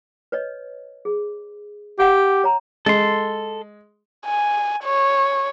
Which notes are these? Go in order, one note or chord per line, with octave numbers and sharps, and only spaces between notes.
B4 C#5 D#5
G#4
G4 F5 F#5 D6
C#5 A#5
G#3 A4 C6
G#5
C#5